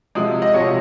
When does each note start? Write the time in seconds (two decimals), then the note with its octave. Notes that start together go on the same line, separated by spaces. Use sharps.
0.15 C3 F3 G#3 D#6
0.42 D#5
0.54 C3 F3 G#3 C#5